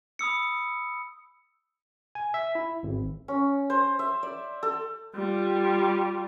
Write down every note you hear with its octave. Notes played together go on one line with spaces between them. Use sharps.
B5 D#6 E6 C#7
G#5
E5
E4
G#1
C#4
C5
E5
D5
A4
G3 F4